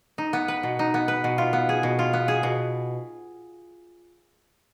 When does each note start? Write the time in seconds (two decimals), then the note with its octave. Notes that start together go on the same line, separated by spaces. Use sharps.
0.18 D#4
0.33 B3
0.48 B4
0.63 B2
0.79 D#4
0.94 B3
1.08 B4
1.24 B2
1.38 F4
1.53 B3
1.69 G#4
1.83 B2
1.99 F4
2.13 B3
2.28 G#4
2.43 B2